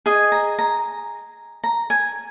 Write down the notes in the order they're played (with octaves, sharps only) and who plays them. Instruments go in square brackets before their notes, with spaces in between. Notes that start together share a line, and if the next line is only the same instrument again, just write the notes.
[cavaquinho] G#4 D#5 G#5
A#5
A#5
A#5
G#5